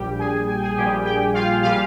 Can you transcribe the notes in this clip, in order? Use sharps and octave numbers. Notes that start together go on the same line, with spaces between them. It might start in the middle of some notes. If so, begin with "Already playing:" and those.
Already playing: A#1 A#2 G3 G4 G5
G#4 G#5
G#5
G5
G#4 G#5
A#1 A#2 G3 G4 G5
G4 G5
F4 F5
A#2 G3 F4 F5